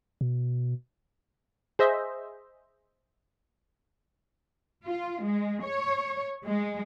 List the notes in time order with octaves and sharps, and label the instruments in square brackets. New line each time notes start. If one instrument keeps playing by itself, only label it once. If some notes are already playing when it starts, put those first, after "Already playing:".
[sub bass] B2
[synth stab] G#4 C5 D#5 E5
[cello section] F4
G#3
C#5
G#3